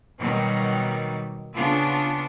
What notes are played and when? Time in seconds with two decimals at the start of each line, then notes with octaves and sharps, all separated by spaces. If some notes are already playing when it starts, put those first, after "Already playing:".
0.20 B2 D#3 F#3 G3
1.55 C#3 B3 D4 F4